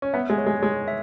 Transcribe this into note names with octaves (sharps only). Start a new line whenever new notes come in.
C#4
B3 E5
G#3
C#5
G#3
G#3 C#5
E5